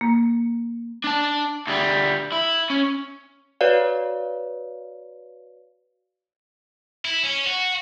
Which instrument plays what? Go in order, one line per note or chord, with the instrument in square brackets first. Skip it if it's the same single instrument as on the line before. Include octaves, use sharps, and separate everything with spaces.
[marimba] A#3
[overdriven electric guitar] D4 A5
D2 G3
E4
C#4
[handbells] F#4 B4 C#5 D5 F5
[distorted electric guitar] E4
C#4
F#4